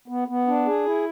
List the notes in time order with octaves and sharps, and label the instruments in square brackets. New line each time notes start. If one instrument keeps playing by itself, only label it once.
[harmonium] B3
B3
D4
G#4
E4